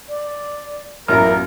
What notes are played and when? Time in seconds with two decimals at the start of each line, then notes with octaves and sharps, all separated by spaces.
0.09 D5
1.08 A1 F#2 B2 A#3 E4 F4 A#4 F6